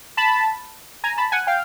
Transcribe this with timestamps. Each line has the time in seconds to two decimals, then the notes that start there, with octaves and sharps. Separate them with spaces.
0.17 A5 B5
1.04 G#5 A#5
1.17 A5 B5
1.32 F#5 G#5
1.47 F5 G5